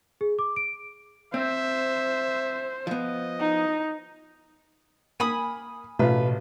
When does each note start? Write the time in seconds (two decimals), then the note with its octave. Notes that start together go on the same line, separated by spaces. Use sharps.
0.21 G#4
0.39 D6
0.56 D7
1.34 C4 C5 E5
2.87 F3 B3 D#5
3.40 D#4
5.20 A#3 G#5 B5 D#6
5.99 A1 B2 F4 B4